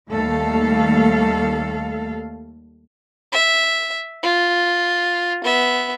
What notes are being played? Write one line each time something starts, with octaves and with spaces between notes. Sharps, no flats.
D#2 G3 A3 A4 F5
E5
F4
B3 E5